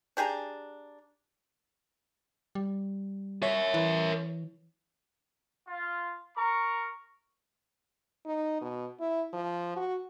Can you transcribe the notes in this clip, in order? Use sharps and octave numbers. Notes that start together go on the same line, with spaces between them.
D4 G4 G#4 A#5
G3
A#4 C#5 E5
E3
F4
A#4 A#5 C#6
D#4
B2
E4
F3
F#4